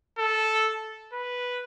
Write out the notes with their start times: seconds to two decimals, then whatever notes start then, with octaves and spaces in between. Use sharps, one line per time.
0.19 A4
1.13 B4